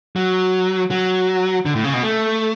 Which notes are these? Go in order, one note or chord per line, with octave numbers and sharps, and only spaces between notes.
F#3
F#3
D3
A2
C#3
B2
A3